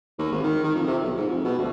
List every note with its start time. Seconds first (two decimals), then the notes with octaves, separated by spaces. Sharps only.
0.19 D#2
0.32 G#1
0.44 D#3
0.64 D#3
0.75 F2
0.88 C3
1.02 B1
1.17 G#2
1.29 F2
1.45 B2
1.58 D2